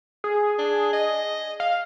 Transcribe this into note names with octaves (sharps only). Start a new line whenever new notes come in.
G#4
D4
D#5
F5